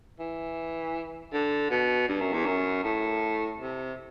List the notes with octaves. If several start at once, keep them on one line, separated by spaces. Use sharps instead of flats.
E3
D3
B2
G2
F#2
E2
F#2
A2
C3